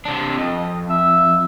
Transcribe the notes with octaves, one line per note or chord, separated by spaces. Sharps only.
C3 D4
F2 D#5
E5